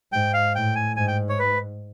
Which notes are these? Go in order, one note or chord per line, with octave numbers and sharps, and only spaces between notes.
G#2 G5
F5
A2 G5
G#5
G#2 G#5
G5
C#5
B4